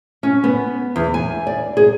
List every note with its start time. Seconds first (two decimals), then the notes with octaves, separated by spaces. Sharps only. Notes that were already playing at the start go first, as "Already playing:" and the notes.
0.23 C#4
0.44 B3
0.96 E2
1.14 G#5
1.47 D5
1.77 G#4